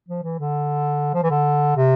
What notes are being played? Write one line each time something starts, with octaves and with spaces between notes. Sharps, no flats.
F3
E3
D3
F3
E3
D3
C3